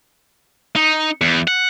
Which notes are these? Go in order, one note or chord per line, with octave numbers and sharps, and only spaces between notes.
D#4
E2
F#5